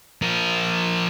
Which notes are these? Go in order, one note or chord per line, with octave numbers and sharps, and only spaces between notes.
F3 A#4